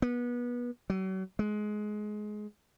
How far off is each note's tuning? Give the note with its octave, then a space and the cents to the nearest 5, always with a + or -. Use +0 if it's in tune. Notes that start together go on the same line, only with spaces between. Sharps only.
B3 -25
F#3 +40
G#3 +20